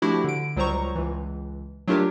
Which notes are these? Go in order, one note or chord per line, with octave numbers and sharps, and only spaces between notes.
F3 A3 D4 E4 F#4 G4
D3 D7
C#2 F#3 G3 C5 A#5 C#6
C#2 E3
F#3 A3 D4 F4 G4 A#4